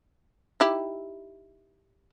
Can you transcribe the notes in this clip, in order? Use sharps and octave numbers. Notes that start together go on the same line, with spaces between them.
D#4 E4 G4